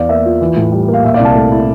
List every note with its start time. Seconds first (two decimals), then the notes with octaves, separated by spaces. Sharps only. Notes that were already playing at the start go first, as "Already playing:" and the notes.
Already playing: E2 E3 D5 F5
0.09 A#3 E5
0.25 F4
0.41 E3
0.57 A2
0.72 G3
0.88 A#3
0.94 F5
1.03 A#2 E5
1.14 D5 F5
1.19 C2
1.25 F5 A5
1.35 A3
1.52 E4